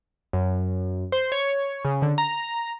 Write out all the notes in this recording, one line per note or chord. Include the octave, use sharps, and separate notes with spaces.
F#2
C5
C#5
C#3
D3
A#5